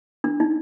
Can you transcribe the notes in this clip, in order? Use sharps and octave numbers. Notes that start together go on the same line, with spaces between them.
D4
D#4